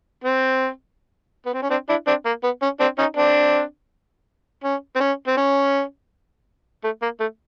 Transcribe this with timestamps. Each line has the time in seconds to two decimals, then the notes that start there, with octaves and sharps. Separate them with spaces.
0.24 C4
1.46 B3
1.54 C4
1.63 C#4
1.70 C4 D4
1.89 D4 E4
2.07 C4 D4
2.25 A#3
2.44 B3
2.62 C#4
2.80 C4 D4
2.98 C#4 D#4
3.17 C4 D4
4.64 C#4
4.96 C4
5.00 C#4
5.27 C4
5.37 C#4
6.84 A3
7.02 A#3
7.20 A3